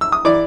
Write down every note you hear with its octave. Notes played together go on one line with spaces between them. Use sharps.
E6
D#6
E3 D5 D6